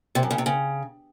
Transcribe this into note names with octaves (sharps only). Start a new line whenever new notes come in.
C3
F#2
C#3
C3
C#3